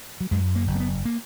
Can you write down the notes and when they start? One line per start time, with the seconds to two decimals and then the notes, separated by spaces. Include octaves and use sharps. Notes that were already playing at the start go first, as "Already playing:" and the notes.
0.21 F#3
0.31 F#2 G#3
0.56 A#3
0.67 F#1
0.75 A#3
0.80 B3
1.05 A#3